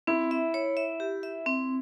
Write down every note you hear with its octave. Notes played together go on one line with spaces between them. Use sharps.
C4 E4
E5
C#5
E5
G4
E5
C4